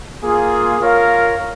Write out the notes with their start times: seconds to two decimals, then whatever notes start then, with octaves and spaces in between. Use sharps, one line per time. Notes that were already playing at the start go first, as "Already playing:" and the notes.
0.22 A#3 F4 G#4
0.80 F4 A#4 C#5 F5